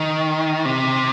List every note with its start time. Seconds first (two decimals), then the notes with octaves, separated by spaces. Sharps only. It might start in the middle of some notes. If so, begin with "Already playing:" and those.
Already playing: D#3
0.65 C3